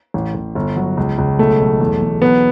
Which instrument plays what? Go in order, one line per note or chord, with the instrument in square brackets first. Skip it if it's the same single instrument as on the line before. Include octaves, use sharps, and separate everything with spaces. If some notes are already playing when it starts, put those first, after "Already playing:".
[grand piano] A1
A1
G1
F#3
C#2
C#2
B1 A3
B1
E2
E2
B1 B3